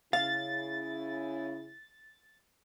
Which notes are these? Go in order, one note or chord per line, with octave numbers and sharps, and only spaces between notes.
C#3 E4 F5 A6